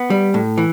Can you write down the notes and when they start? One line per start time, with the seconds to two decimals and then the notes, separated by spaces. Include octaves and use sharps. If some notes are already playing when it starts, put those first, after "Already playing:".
Already playing: B3
0.10 G3
0.34 A2
0.58 E3